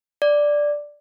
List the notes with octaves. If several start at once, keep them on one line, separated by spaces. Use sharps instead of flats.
D5